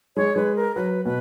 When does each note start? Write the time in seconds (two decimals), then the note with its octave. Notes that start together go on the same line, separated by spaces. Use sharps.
0.17 G#3 C#5
0.36 G#3 B4
0.56 A#4
0.75 F#3 B4
1.05 B2 B4